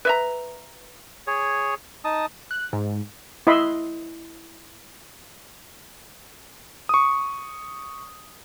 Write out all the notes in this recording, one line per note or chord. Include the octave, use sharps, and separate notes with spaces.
B4 E5 A#5
G#4 C#5
D#4 A5 D#6
F#6
G#2
E4 D#5 E5 B5 C6
C#6 D#6